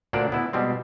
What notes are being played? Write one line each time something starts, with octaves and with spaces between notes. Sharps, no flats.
D2 A#2 A#3 D4 D5
B3 E4
B2 G3 G#3 C4